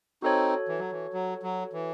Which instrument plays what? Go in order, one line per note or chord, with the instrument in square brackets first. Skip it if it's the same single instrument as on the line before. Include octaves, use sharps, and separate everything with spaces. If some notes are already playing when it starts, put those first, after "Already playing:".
[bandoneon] C4 D#4 [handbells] F#4 A4 C#5
[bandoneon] E3
F#3
E3
F#3
F#3
E3